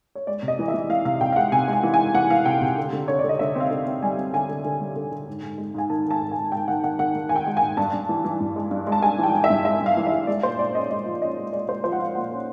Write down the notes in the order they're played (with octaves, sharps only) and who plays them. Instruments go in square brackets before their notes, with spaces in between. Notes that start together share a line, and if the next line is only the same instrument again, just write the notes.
[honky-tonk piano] C#5
G#3 D5
C3
D#5
E3
E5
E3
E3 F5
C3 F5
C3 G5
F5
G#3 F#5
C3 G#5
G#3 G#5
E3
G#3 G#5
E3 F#5
E3 F5
C3 G5
C3
D3
D3
D3 C#5
D5
D3
D#5
D3 E5
C4 F5
D3
C4
G3 G#5
C4
D3 G#5
D3
D3
G3
D3
D3
G#2
G#2
G#3
G#2 G#5
D#3 A5
D#3
A5
G#2
G#5
G#2
G#2 G5
D#3 F#5
D#3 F#5
D#3 F#5
D#3
D#3 G#5
G5
G#3
G#5
G#2
G2 A5
G2
E3
E3
G2
G#3
G2
G#3
A5
G#3 G#5
E3
G5
E3
E5
G2
G#3 E5
G2
F5
E3
E5
G#3
G#3 D5
A#2 C5
A#2 D5
C#4 D#5
G#3 D#5
F3
C#4 D#5
G#3
G#3 D5
G#3 C5
F3 C5
F#5
F3 F5
A#2 F#5
C#4